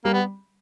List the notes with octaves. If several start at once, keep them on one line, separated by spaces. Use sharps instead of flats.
G3 A#3
B3